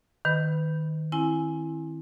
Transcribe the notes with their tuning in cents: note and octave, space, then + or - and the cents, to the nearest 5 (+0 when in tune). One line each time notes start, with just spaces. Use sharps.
D#3 +0 B4 +30 B5 +0
C4 +30 E4 +0 G#5 +5